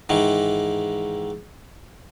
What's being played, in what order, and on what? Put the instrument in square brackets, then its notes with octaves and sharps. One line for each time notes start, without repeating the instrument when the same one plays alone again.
[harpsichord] G#2 D#3 E3